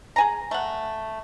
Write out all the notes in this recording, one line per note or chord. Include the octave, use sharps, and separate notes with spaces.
G#4 G#5 A#5
A3 F#5